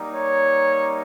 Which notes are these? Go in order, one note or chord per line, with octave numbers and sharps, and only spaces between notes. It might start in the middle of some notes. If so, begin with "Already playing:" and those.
Already playing: G3 A#3 D#4
C#5